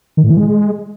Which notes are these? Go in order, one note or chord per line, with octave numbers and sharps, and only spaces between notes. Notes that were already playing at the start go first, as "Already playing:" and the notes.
D#3
A2
E3
G#3